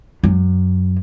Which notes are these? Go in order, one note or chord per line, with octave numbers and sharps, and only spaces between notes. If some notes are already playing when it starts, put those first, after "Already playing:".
F#2